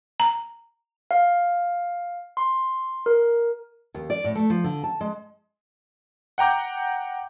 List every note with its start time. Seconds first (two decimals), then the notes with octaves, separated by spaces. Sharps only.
0.20 A#5
1.11 F5
2.37 C6
3.06 A#4
3.95 D#2
4.10 D5
4.24 A2
4.35 A3
4.50 F3
4.64 D3
4.83 A5
5.01 G#3
6.38 F#5 G5 A#5 D6 G6